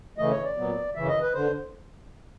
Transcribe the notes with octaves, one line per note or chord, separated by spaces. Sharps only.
C#3 E3 A3 D#5
C#5
D5
A#2 F#3 B3
F#2 C#3 E3 E5
D#5
B4
D3 C5